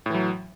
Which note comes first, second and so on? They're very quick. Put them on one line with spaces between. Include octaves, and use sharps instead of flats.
A2 E3 F#3